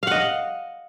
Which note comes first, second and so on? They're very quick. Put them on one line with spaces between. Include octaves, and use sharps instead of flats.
F5 F#5 D#5